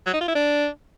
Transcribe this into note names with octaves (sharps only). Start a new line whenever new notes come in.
F#3
D#4
F4
E4
D4